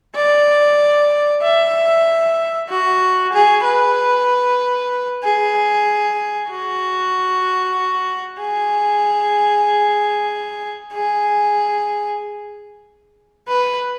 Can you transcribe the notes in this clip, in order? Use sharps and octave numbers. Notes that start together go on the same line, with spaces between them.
D5
E5
F#4
G#4
B4
G#4
F#4
G#4
G#4
B4